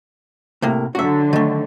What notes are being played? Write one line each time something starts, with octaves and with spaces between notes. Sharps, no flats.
A2 C3 A#3
D3 F#3 F#4 E5
D#3 A3